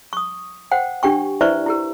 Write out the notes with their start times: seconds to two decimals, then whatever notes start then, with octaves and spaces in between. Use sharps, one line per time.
0.13 C#6 D#6
0.72 C5 F#5 G5
1.03 D4 G4 G5 C#6
1.41 E4 B4 C5 D5 E5 C#6
1.66 E4 G4 A#4